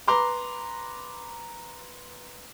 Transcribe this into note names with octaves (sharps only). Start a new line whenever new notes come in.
B4 A#5 C6 D6